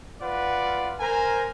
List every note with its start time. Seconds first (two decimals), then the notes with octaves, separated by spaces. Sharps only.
0.22 F4 B4 D5 F#5
1.00 A#4 C5 G#5 A#5